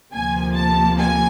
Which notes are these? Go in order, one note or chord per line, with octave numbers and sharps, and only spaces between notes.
D2 C3 F3 A#3 G#5
A5
G#5